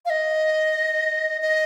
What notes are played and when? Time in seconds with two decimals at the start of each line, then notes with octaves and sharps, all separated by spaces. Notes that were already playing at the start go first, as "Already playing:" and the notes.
0.05 F5
0.10 D#5
1.42 D#5